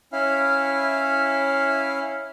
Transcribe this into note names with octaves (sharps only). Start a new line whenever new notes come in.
C#4 E4 F5